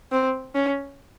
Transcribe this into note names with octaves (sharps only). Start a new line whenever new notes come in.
C4
C#4